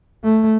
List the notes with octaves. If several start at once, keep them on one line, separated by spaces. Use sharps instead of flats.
A3